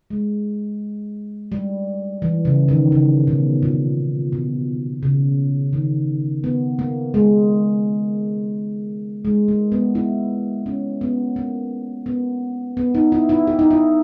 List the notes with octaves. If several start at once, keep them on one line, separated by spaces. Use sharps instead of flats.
G#3
G3
E3
C#3
D#3
C#3
B2
A#2
B2
C#3
D#3
B3
A#3
G#3
G#3
A#3
B3
E4
C#4
B3
A#3
B3
B3
D#4
E4
E4
G4
D#4
E4